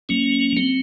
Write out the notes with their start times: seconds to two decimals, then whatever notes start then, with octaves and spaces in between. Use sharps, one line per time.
0.09 F#3 A#3 C#4
0.57 F#3 C4